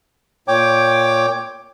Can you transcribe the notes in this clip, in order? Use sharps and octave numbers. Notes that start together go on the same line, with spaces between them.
A#2 C#5 G5 D6